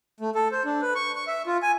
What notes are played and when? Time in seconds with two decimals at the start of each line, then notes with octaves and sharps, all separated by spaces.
0.20 A3
0.35 A4
0.51 C5
0.65 D4
0.82 B4
0.95 C#6
1.15 C#6
1.27 E5
1.46 F4
1.62 G#5